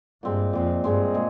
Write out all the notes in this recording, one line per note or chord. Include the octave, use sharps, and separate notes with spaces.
G2 A#2 G#3 C4
F2 A#2 G#3 C4
G2 A#2 G#3 C4
A#2 G#3